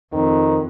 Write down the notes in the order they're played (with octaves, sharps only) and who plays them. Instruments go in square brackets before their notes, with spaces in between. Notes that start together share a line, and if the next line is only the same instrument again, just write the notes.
[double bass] F2 [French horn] D#3